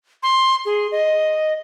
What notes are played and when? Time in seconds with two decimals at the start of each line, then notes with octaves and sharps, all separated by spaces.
0.23 C6
0.65 G#4
0.92 D#5